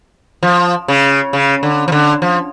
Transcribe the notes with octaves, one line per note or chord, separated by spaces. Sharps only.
F3
C#3
C#3
D3
F3
D3
F3